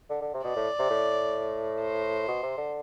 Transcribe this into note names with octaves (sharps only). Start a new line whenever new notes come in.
D3
D3
C3
B2 D5
A2
C3
A2
C5
B2
C3
D3